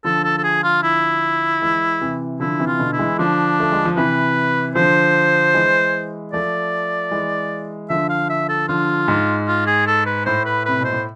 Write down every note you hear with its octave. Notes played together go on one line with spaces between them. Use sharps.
D3 F3 A4
A4
A4
G#4
F4
E4
E3 G#3
C3 E3
D3 F3 E4
C3 E3
F4
B2 D3
E4
E3 G#3
D3 F3 D4
A3
G#3
F3
C3 E3 B4
D3 F3 C5
E3 G#3
F3 A3 D5
E3 G#3
D3 F3 E5
F5
E5
A4
D3 F3 F4
G#2
F4
G#4
A4
B4
A2 C5
B4
C3 B4
B2 C5
A2